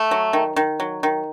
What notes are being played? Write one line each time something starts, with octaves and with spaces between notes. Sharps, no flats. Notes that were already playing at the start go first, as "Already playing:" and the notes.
Already playing: A3
F#3
D#3
D#3
F#3
D#3